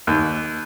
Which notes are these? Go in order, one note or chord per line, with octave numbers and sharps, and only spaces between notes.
D#2